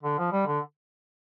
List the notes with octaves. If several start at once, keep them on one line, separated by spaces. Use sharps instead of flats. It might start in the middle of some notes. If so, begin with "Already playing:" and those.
D3
F3
G3
D3